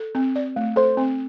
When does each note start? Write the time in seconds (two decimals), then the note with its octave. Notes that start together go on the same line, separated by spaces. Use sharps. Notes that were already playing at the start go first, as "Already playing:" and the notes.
Already playing: A4
0.15 C4
0.36 D5
0.56 A3
0.76 A4 C5
0.97 C4